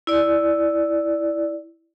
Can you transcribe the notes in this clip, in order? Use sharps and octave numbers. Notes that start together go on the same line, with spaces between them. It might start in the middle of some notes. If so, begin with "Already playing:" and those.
E4 D5